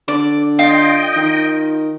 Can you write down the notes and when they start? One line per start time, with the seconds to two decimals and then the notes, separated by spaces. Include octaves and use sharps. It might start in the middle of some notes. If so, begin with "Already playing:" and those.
0.08 D3 D5
0.59 F4 D#5 G5
1.16 D#3